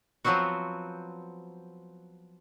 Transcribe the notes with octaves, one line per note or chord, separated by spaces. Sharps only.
F3 F#3 B3 C4 F#4